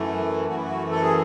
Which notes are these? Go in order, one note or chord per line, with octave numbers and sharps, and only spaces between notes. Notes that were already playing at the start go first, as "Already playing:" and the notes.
Already playing: F#2 E3 A3
F#2 E3 A3 F#4
E4
F#4
A4
G#4